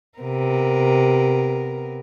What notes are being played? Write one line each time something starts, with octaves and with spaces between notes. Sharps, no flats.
C3 B3 A#4